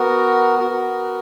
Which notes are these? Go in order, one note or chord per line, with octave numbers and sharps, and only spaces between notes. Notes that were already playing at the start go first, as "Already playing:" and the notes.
Already playing: B3 F#4 A#4
B3 F#4 A#4